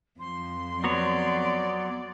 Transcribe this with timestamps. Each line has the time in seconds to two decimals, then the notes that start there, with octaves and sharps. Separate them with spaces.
0.19 F2 F3 C6
0.84 F#3 B3 C#5 D5